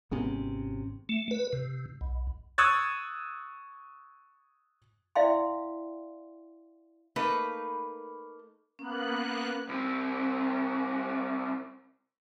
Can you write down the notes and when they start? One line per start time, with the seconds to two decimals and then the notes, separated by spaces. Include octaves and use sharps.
0.11 G#1 C3 G#3 B3 C#4
1.09 A3
1.31 B4
1.53 C3
2.01 B1
2.58 C#6 D#6 E6 F#6 G#6 A6
5.15 E4 D5 E5 F5 G5 C6
7.16 A3 A#3 D#4 B4
8.79 A#3 B3 C#4 F#6
9.69 C2 C4